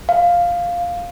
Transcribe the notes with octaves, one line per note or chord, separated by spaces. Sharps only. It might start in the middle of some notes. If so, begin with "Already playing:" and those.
F5